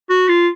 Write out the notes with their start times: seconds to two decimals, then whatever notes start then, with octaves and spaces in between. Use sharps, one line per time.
0.10 F#4
0.29 F4